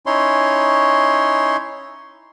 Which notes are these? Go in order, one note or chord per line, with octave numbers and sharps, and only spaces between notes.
C#4 D#4 E4 C#5 C6